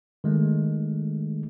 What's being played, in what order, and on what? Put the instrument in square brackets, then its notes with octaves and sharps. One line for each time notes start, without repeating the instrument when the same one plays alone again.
[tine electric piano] D#3 G#3 A3